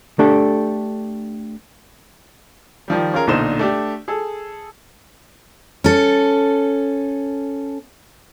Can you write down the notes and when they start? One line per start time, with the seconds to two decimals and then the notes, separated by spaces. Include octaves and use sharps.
0.19 A3 D4 G4 A4
2.88 D#3 F3 G3
3.14 C#4 F4 G#4 A#4
3.27 B1 A#2 D3 D#4 C5 E7
3.59 A3 D4 G4
4.08 G#4 A4
5.84 C#4 A4